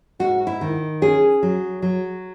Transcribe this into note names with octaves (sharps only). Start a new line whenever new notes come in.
G#2 F#4
E4
D#3
C#4 G#4
F#3
F#3